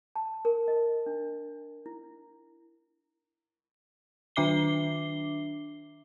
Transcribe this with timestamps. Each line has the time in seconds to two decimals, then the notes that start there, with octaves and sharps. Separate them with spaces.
0.16 A5
0.45 A#4
0.68 D#5
1.06 D4
1.86 E4
4.36 D#3 D4 E5 D6 C7 G7